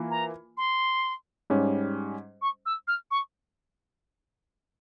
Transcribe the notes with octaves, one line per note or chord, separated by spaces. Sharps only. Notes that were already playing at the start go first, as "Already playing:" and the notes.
Already playing: E3 A#3 F4
A#5
C6
G#2 G3 C#4
C#6
E6
F6
C#6